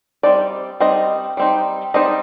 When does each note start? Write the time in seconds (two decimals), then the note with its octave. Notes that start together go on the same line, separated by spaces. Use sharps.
0.23 G3 C4 D#4 D5
0.80 G3 C4 D#4 D#5
1.37 G3 C4 D#4
1.94 G3 C4 D#4 D#5